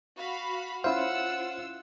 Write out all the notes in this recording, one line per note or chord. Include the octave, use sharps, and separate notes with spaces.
F#4 F5 B5
C#4 E4 F4 C5 F5 F#5 E6